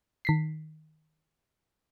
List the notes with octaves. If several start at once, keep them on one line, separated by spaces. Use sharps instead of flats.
D#3 B6 C7